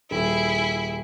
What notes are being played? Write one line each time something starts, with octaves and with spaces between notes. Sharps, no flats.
D#1 E4 G#4